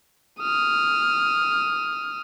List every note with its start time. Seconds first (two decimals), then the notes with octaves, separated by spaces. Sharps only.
0.41 D#6 F6